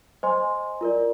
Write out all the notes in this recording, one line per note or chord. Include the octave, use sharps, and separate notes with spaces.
C5 D#5 G#5 C6
F4 A#4 D5